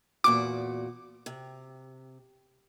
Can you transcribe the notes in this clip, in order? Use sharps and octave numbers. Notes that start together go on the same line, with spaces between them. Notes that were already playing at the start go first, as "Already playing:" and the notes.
E2 A#2 F#4 D6
C3